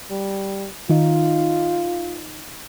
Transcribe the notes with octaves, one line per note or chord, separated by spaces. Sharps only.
G3
D#3 D#4 F4